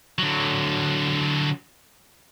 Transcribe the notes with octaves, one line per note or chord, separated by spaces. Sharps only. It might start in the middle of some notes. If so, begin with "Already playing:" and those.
D3 F#3